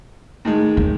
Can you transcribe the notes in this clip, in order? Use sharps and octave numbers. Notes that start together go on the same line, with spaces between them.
A2 D#3 G#3
D#2